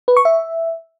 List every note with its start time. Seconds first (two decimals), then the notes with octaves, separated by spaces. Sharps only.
0.08 B4
0.17 C#6
0.25 E5